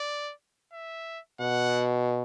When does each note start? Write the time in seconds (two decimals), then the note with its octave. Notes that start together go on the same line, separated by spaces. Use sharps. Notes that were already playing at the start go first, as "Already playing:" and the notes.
Already playing: D5
0.73 E5
1.40 B2 F#5